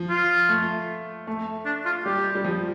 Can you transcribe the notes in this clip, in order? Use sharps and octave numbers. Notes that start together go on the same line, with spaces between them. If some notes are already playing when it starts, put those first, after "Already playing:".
Already playing: F3
F4
A3
A3
D4
F4
G3 G4
G3
F3